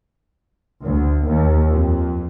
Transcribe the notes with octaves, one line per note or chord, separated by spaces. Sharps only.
D2
D#2
F2